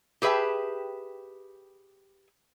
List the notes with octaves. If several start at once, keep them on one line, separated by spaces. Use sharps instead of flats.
G4 G#4 B4 E5 G5 A5